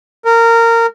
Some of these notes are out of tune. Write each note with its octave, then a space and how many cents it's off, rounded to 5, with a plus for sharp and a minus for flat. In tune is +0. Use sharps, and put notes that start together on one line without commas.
A#4 -20